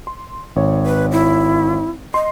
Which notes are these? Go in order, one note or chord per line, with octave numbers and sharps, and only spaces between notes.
C6
G#1 C#5
B4
E4
D#5 C6